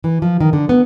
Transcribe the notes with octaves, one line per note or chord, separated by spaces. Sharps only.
E3
F3
D#3
D3
B3